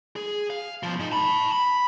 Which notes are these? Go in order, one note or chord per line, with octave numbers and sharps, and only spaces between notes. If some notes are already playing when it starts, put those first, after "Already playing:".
G#4
F5
B2 F3
G#2 D#4
A5 B5
B5